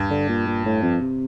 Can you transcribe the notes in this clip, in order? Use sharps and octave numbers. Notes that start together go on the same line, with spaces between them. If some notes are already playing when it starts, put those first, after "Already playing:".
Already playing: G2
D3
A#2
A#2
A2
F2
C3